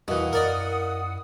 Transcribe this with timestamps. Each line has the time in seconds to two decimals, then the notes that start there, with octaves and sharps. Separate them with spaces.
0.08 E2 B2 E3 A#3 E4 F#5 D#6
0.33 F#2 A#4 D5 D#5